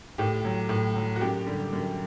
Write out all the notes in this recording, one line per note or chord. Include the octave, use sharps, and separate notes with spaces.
A2 G4
F#3
A2
F#3
F#4
F#2 G4
D3 G3
F#2